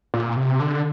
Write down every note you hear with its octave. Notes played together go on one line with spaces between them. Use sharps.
A#2
C3
D3